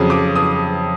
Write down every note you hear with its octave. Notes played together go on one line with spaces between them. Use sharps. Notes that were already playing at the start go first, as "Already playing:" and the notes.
Already playing: F2 C#3 F#3 D#6
D6
D#6